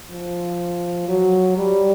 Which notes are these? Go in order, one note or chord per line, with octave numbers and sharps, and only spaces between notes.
F3
F#3
G3